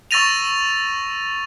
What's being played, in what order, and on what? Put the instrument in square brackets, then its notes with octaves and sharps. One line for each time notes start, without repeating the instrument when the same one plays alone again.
[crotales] C#6 E6 A6 A#6 D#7 F7